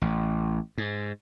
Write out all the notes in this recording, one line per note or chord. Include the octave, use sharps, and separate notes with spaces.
A1
G#2